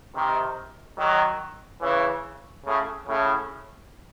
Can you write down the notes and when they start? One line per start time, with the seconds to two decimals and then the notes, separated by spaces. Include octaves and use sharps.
0.14 C3 D#3
0.97 D#3 F#3
1.81 C#3 E3
2.66 A2 C#3
3.07 A2 C#3